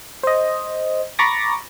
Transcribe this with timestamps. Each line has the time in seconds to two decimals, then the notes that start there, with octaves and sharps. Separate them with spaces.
0.23 C5 D#5
1.19 A#5 B5 C#6 D6 A6 A#6